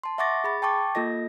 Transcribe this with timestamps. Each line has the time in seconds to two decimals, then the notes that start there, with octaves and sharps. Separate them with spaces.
0.03 A5 C6
0.18 E5 F#5 C#6 D6 A6 A#6
0.44 G#4 B5 A6
0.62 G5 A5 C#6 D6 A6
0.95 A#3 F4 A4 D#5 A#6